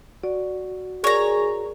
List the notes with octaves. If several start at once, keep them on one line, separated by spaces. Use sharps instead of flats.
F#4 D5
G#4 A#4 C#5 D5 A#5